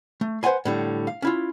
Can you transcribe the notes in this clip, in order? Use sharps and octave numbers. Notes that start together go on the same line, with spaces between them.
A3
B4 C5 D5 F#5 G#5 C6
A2 D3 G3
F5
C#4 E4 F4